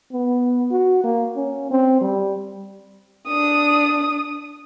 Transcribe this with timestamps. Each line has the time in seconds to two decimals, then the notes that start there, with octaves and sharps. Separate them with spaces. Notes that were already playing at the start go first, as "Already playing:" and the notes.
0.13 B3
0.71 F#4
1.04 A#3
1.37 C#4
1.71 C4
2.01 G3
3.28 D4 D#6